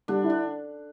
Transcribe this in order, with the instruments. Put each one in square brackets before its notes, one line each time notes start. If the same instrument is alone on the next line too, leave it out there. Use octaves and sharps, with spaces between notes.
[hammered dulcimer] D3 D4 [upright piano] G3
[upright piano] E4
[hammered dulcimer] D4